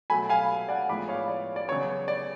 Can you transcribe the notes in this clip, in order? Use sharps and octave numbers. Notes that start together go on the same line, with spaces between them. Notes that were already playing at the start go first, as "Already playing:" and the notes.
B2 F#3 A3 G#5 B5
F5 G#5
D5 F#5
A2 F3 G#3 B3 B5 D6
C#5 F5
D5
D5
C#3 F#3 B3 C#5
D5